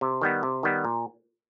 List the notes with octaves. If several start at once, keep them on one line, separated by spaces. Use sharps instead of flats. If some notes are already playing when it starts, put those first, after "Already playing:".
C3
D#3 G3 B3
C3
D#3 G3 B3
A#2